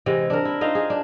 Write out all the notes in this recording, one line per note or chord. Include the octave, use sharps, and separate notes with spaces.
C3 E3 G#3
D4 A#4
E4
D#4 F4 C5 D#5
G#4
D4